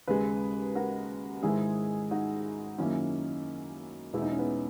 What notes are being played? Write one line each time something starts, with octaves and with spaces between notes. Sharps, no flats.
D#2 C#3 G#3 G#4 B4
F#4 A#4
G#2 D#3 G#3 E4 G#4
D#4 F#4
F#2 D#3 A#3 C#4 E4
E2 B2 G#3 E4
D#4
C#4
B3 D#4